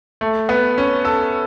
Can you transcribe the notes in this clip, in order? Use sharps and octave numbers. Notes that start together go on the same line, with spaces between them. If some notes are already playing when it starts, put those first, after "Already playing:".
A3
B3
C#4
A4